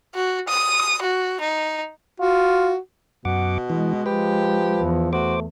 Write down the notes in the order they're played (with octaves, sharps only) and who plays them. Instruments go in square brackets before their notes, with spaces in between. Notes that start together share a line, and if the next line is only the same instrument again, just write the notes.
[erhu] F#4
D#6
F#4
D#4
[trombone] F4 [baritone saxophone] F#4
[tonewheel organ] F#2 F#5 D6 [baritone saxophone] B2
[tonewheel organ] E3 [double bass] G#3
[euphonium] F3 [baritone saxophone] G4 [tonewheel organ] B4
[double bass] E2
[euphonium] A3 [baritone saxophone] F#4 [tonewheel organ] C5 D6